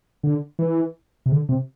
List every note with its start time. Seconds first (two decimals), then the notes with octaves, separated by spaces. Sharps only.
0.23 D3
0.59 E3
1.26 C3
1.32 D3
1.49 C3